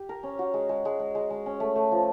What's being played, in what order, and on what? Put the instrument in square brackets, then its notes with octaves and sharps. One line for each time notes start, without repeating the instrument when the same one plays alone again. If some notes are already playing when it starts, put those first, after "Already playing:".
Already playing: [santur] G4
A#4
C#4
F#4
G#3
G#3
G#3
G#3
G#3
G#3
C#4
A3
A3
F3